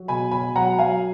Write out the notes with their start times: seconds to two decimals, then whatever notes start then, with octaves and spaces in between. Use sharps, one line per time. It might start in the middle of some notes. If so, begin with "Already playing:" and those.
Already playing: F#3
0.08 B2 G#5 B5
0.31 B2 G#5 B5
0.56 F#3 F#5 A#5
0.78 F#3 F5 G#5